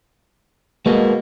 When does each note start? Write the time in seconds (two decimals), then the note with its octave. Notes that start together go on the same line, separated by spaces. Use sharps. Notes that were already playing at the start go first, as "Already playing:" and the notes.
0.86 B2 G#3 A#3